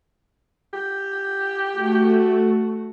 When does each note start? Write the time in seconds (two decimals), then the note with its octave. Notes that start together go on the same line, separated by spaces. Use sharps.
0.74 G4
1.75 A3 F#4